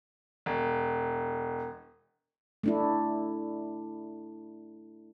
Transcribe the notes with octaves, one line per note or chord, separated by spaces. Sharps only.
E1
A3 D4 E4